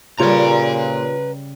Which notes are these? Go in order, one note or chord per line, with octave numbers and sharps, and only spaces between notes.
A#2 C#3 G3 F4 B4 C#5 A#5